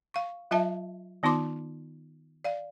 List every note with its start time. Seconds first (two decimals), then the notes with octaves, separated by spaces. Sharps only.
0.14 F5 C#6
0.51 F#3 F4 D#5 E5 A5
1.23 D#3 B3 D#4 F4 C6 D6
2.44 D5 F5